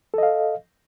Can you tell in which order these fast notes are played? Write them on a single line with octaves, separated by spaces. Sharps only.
A4 D#5 F5